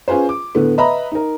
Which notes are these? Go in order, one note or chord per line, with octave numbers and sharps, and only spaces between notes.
C#4 F4 G#4 B4 C5
D6
A2 D3 A3 B3
B4 D#5 E5 A#5 B5
D#4 A#4